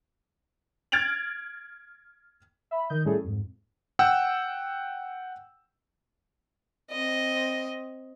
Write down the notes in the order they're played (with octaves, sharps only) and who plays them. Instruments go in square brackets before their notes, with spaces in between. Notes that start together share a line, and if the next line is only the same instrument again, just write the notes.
[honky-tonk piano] F6 G#6 A6 D7 F7 F#7
[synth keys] E5 B5
D#3 D#5 G6
A2 G3 C#4 E4 G#4 A4
F2 G#2
[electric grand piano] F#5 G5 E6
[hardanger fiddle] C4 D#5